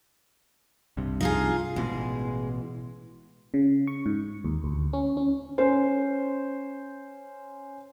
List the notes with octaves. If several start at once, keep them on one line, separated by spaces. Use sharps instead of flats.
C2 G2 C3
D#4 F4 G#4
A1 B2 E3 G#3
C#3
C#6
G#2
D#2
D2
C#4
C#4
C#4 C5